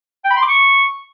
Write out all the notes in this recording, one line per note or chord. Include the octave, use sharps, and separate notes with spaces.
G5
B5
C6
D6
C#6